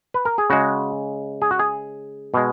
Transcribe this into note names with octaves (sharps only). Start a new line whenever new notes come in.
B4
A#4
G#4
C#3 G#3 F#4
G#4
F#4
G#4
B2 G#3